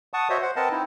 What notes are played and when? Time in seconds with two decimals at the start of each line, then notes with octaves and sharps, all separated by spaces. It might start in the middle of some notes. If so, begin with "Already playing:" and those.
0.14 F#5 A5 C#6 D#6
0.30 F#4 C5 C#5 D#5 E5
0.42 C5 F#5
0.56 C4 A#4 B4 D#5 F#5 A5
0.72 C4 D#4 E4